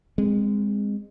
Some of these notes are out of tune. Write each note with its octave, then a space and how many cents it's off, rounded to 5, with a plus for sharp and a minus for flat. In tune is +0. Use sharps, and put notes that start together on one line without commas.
G#3 -20 C4 +0